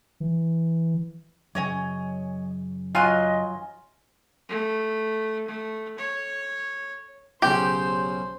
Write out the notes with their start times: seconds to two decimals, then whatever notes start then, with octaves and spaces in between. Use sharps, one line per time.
0.20 E3
1.55 F#2 C#3 C#5 D#5 G#5
2.95 F#3 F4 D#5 G#5 C6 F#6
4.49 A3
5.47 A3
5.98 C#5
7.42 B1 C#3 C#4 G4 C5